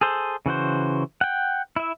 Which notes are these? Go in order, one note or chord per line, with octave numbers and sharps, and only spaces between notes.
G#4 A4 C5
C#3 E3 F#4 C5
F#5 G5
E4 E5